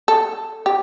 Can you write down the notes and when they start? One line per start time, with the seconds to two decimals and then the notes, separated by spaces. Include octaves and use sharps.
0.08 A4
0.66 G4